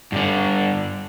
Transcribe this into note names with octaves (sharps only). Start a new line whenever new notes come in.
G2 D3